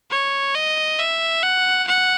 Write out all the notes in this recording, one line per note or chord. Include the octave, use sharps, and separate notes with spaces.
C#5
D#5
E5
F#5
F#5